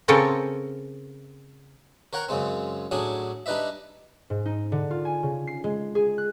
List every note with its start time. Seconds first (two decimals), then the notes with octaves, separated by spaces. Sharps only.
0.08 C#3 C4 A4 A#4 C#5 G#5
2.13 A#4 C#5 F#5 G5 A#5
2.29 F#2 C#3 G#3 C4
2.91 A2 F#3 D4 G#4 D#6
3.46 G3 D4 D#4 B4 D#5 E5
4.30 G#2
4.45 D#4
4.72 D3
4.91 F4
5.05 G#5
5.23 C#3
5.47 C7
5.64 G#3
5.95 G#4
6.18 F#6